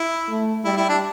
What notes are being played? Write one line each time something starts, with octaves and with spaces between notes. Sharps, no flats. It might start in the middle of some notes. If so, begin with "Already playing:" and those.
Already playing: E4
A3
G3 E4
E4
D4